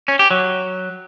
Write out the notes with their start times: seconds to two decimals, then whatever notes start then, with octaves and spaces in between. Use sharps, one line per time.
0.08 C#4
0.19 G4
0.31 F#3